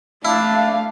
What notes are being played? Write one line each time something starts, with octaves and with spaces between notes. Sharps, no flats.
A3 D4 E4 F5